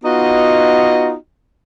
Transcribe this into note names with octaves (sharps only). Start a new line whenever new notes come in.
B3 D#4 F4 F#4 D#5